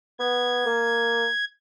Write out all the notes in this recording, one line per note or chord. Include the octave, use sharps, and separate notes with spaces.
B3 G#6
A#3